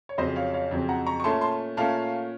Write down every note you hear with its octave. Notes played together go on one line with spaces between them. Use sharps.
C#5
F2 C#3 F#3 C4 C5 D#5
C#5 F5
C#5 F5
F2 C#3 F#3 C4
F#5 A#5
A#5 C#6
C#6
A#2 A3 C#4 A5 C6
A5 C6
A#2 A3 C#4 F5 A5